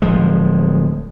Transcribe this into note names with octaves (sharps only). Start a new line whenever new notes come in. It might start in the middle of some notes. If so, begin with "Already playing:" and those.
D1 F3 G#3